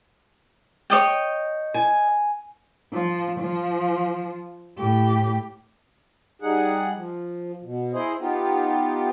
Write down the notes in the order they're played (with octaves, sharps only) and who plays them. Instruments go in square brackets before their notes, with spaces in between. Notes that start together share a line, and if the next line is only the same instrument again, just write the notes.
[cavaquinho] C#5 D#5 G5
[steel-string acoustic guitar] G#5
[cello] F3
F3
A2 G4
[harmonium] G3 D#4 G#4 F#5
F3
B2
E4 G#4 C5 D#5
B3 D#4 F4 G4